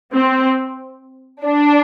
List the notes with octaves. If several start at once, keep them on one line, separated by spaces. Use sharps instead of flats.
C4
D4